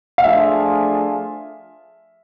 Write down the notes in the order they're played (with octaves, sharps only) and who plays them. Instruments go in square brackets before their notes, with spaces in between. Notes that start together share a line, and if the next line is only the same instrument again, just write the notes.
[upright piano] F5
[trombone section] F3 A3 D4 F4 G#4 [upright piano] E5